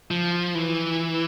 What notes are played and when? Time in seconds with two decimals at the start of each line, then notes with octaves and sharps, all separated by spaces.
0.11 F3
0.55 E3